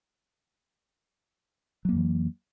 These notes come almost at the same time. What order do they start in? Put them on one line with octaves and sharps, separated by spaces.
F#3 A#3 F2 E3